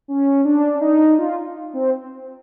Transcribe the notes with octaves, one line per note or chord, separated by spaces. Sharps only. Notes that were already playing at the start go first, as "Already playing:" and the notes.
C#4
D4
D#4
F4
C4